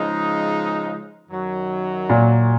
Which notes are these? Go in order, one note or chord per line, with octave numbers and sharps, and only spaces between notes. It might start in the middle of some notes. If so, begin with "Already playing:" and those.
Already playing: C#3 F3 G#3 D#4
F#2 D#3 F#3
A#2